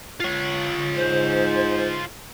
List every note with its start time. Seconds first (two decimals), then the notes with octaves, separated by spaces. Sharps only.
0.20 F4 C#5
0.96 G#2 C5